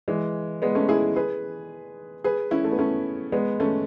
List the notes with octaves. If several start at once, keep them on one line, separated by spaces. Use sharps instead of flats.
E3 G#3
G#3 B3
A3 C#4
E4 G#4
G#4 B4
G#4 B4
C#4 E4
A3
B3
A3 C#4
G#3 B3
A3 C#4